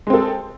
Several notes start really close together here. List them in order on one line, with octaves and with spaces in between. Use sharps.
G#3 C4 A4